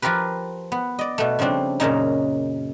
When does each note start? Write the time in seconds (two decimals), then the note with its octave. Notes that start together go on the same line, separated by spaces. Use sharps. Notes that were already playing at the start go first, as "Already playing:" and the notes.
0.02 F3 F4 G4 A#4 B4
0.72 B3
0.99 D5 D#5
1.18 B2 A3
1.39 C#3 F3 G3 C4 D4
1.80 F#2 A#2 C#3 D#4